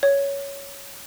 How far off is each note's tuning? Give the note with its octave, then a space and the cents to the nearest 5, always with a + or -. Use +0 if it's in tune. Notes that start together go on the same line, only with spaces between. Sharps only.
C#5 +10